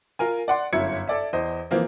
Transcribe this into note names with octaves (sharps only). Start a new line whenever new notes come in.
F4 A#4 G#5
D5 F#5 C6
G1 F#2 E4 E5 G#6 C#7
A4 D5 E5
E2 C5 D#5
E3 F3 A#3 C4